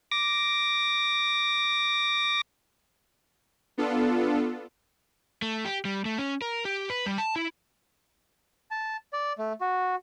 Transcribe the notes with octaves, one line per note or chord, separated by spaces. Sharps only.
D6 A#6
B3 D4 F4 A4
A3
G4
G3
A3
C#4
A#4
G4
B4
G3
A5
E4
A5
D5
A3
F#4